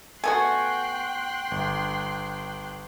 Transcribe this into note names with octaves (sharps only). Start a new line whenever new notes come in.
A3 B3 F#4 G5 G#5 C6 F#6
G1